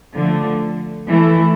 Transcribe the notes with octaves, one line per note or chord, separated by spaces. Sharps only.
D3 F3 A3
E3 A3 E4